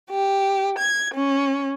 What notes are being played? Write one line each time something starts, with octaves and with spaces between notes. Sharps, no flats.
G4
G#6
C#4